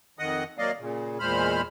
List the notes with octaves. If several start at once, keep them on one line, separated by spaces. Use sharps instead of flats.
F2 D#3 D#5 F#5 D#6
F#3 A#3 D5 D#5 F5
A#2 C#3
E2 A#2 G#3 C5 B5 F6